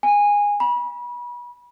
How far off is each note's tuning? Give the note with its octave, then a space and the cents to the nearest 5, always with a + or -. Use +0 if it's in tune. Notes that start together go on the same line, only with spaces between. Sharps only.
G#5 -15
B5 -30